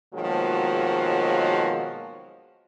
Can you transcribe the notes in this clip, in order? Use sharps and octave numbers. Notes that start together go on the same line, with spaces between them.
B2 D#3 F3 F#3 G#3 A#3